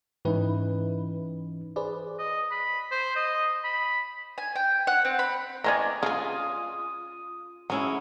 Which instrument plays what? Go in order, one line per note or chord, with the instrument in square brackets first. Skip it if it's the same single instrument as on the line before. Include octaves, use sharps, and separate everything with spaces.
[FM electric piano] G#2 E4 B4 [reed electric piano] E3 C#4 D#4
[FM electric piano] G#4 B4 D5 [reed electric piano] C5
[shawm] D#5
B5
C5
D#5
B5
[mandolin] G#5
G5
F#5
C4
B5
[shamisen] E3 C4 C#4 [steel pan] D5 G#5 A#5 [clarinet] D#5
[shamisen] C#3 G#3 G#4 [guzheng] F4 [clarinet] D#6
[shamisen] F#3 [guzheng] G#3 C#4 E4